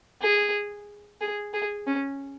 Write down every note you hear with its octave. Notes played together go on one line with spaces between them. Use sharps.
G#4
G#4
G#4
C#4